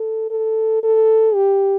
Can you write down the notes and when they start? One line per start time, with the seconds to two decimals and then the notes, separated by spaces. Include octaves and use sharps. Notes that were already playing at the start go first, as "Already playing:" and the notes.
Already playing: A4
0.31 A4
0.83 A4
1.35 G4